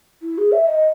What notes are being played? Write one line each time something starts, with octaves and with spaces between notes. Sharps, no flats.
E4
G#4
E5
D#5